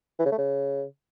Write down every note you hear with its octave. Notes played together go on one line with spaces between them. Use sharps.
E3
C#3
A3
C#3